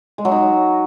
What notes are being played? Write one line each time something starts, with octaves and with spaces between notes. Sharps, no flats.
G#3
F#3
D#4